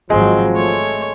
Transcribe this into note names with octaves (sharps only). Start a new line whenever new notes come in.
G#1 F3 F#3 G#3 C4
A3 C#5